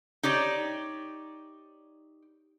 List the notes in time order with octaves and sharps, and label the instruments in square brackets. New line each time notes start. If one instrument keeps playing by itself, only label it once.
[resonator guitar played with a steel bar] D#4 G4 C#5 D5